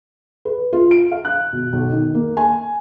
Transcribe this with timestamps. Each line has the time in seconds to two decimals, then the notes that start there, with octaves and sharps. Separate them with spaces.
0.45 B4
0.73 F4
0.91 D7
1.11 F5
1.25 F#6
1.53 B2
1.73 B1
1.92 D#3
2.14 A#3
2.37 G#5